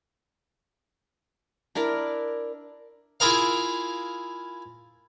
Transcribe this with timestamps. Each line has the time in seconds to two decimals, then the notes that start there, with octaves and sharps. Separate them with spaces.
1.75 D4 E4 A#4 D5
3.20 E4 F4 G#4 A#4 F5